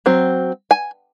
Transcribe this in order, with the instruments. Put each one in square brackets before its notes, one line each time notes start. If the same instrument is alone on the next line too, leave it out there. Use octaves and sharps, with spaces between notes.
[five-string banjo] F#3 C4
G#5